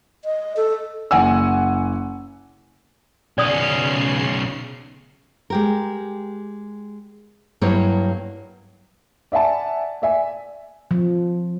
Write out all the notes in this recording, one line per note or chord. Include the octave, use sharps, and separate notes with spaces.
D#5
A4
F#1 F#5 G#5 E6
B1 C#3 C#4 D5 D#6 C7
G#3 G4 A#4
G2 F#3 A#3 E4 G4 C#5
D5 E5 F#5 G#5 A5
D5 E5 G#5
F3